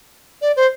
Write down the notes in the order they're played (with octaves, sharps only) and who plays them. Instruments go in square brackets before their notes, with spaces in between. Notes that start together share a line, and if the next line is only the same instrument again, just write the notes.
[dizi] D5
C5